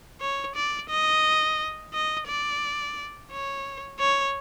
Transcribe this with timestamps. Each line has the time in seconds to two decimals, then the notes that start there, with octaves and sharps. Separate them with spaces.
0.21 C#5
0.55 D5
0.90 D#5
1.93 D#5
2.28 D5
3.31 C#5
4.00 C#5